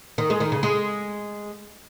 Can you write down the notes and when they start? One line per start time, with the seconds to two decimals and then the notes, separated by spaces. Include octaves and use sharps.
0.18 D#3
0.30 G#3
0.40 D#3
0.52 C#3
0.63 G#3